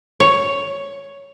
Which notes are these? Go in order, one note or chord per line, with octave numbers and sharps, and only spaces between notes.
C#5